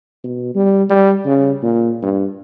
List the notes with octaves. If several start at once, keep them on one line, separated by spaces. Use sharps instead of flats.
B2
G3
G3
C#3
A#2
G2